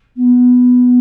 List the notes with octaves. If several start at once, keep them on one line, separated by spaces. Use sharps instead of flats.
B3